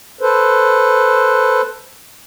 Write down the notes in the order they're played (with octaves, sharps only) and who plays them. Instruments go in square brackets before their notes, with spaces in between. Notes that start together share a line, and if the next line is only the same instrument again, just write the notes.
[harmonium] A4 B4 C5